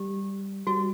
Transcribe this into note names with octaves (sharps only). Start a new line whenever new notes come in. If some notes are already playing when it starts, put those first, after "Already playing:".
Already playing: G3 G4
G3 F#4